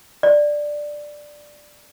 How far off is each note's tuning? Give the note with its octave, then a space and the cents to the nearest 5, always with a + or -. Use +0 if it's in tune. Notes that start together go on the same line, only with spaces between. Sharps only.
D5 +5